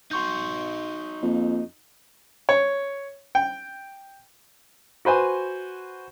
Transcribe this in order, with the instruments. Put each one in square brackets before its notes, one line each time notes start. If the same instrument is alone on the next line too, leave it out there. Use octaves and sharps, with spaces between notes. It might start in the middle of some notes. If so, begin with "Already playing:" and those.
[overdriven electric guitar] D#4 F#4 [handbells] C6 C#6 G6
[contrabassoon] F2 [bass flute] A#3
[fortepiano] C#5
G5
F#4 B4 C5 G#5